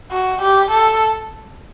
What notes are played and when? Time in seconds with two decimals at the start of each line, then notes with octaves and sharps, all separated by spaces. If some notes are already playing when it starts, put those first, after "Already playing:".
0.11 F#4
0.42 G4
0.71 A4